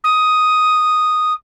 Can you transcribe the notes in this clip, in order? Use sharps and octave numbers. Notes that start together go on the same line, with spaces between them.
D#6